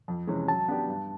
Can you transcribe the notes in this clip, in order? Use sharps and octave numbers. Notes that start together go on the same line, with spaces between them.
F2
C3 E3 G#3 C#4
F#3 A5
B3 D4 G4
G2